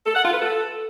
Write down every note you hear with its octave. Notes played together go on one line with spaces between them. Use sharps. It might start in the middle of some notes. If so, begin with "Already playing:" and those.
A4
F#5
F4
B4
A4